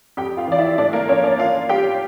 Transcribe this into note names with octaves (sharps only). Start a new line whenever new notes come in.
F2 G4 G5
F4 F5
E3 D5
E4 E5
A2 D4 D5
A#3 A#4
F3 C#4 C#5
D4 D5
F4 F5
G3 G4 G5